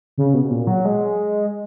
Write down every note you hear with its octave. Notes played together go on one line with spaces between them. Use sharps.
C#3
B2
A#2
F#3
G#3